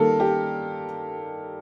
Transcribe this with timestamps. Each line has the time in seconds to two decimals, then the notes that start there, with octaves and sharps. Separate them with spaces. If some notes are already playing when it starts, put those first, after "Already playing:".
Already playing: D#3 G3 A#3 A4 A#4
0.20 G4